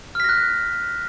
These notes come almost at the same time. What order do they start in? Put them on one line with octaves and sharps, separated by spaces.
F6 B6 A#6 F#6